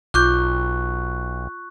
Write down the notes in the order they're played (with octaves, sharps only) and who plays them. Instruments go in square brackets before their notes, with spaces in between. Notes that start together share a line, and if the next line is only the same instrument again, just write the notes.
[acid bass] B1 [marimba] F4 D6 G6 [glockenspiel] C#6 F#6